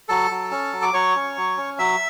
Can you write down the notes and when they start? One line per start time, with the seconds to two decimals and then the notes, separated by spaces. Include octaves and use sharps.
0.08 F#3 A4 A5
0.31 F#3
0.51 C#4
0.73 F#3
0.82 D6
0.94 F#3 C#5 C#6
1.15 C#4
1.37 F#3
1.57 C#4
1.78 F#3 E5 E6